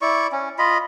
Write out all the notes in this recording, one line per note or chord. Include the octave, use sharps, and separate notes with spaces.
E4 D5 C#6
C#4
F4 D#5 B5